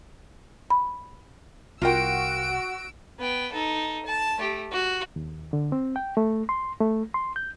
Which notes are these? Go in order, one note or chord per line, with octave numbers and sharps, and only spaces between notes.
B5
C2 F4 F#4 A#4 G5 E6 D7
B3 G5
D#4 A4
A5
A3 G4
F#4
D#2
D3
C4
G5
A3
C6
A3
C6
G6